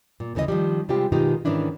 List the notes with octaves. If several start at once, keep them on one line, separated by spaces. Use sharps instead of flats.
A#2
D2 C#3 E3 A#4 D#5
D#3 F3 G3
C3 G3 G#3 C4 F4 G4
B2 D#3 G#3 D#4 F4 G4
G#2 D#3 E3 C#4 D4 E4